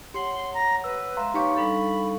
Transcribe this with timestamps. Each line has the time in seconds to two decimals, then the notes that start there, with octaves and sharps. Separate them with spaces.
0.14 G4 C#5 F#5 C6
0.54 A#5
0.84 B4 E6
1.17 G#3 E5 F5 A#5 C6
1.34 A#3 D#4 G4 B4 C#5 F5 C#6
1.57 G3 D4 A4 B5